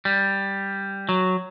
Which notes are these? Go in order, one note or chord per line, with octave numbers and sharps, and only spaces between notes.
G3
F#3